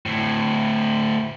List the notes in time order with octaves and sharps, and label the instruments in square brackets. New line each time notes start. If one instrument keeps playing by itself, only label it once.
[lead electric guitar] D2 A2